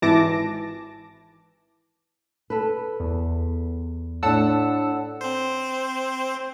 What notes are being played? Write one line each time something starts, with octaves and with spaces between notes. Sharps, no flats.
G#1 E3 A5 D6 A#6
A4 B4
E2
A2 D4 F#5 A5 E6
C4 C5